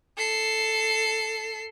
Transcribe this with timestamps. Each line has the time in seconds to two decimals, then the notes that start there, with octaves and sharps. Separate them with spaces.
0.18 A4 C7